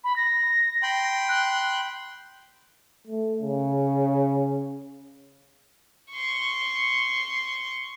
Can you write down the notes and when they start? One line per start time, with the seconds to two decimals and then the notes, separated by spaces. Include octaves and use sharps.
0.04 B5
0.16 A#6
0.83 G5 B5 C6
1.29 F#6
3.07 A3
3.41 C#3
6.12 C6 C#6